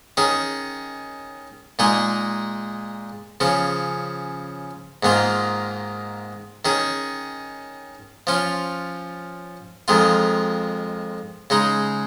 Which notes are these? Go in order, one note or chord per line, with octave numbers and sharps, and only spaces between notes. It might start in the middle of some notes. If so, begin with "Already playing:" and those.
D#3 C#4 G#4
A#2 G#3 D#4 G#4
C#3 F3 C#4
G#2 D#3 A#3 F4
D#3 C#4 G#4
F3 C#4 F4
F2 D#3 G#3 F4
C#3 G#3 D#4